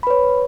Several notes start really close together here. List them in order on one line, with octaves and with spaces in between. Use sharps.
B5 B4 C#5